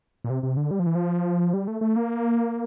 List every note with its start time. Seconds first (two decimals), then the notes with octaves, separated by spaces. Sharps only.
0.24 A#2
0.30 C3
0.43 C3
0.57 D3
0.71 G3
0.79 F3
0.86 E3
0.95 F3
1.54 G3
1.68 A3
1.81 A3
1.96 A#3